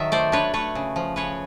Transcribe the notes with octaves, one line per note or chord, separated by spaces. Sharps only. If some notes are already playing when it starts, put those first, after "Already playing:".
Already playing: D#3 F#3 E5 A5
A3 C5 D5
D4 B4 C#5
A3 B4 C#5
C#3
F3
C#3 B4 C#5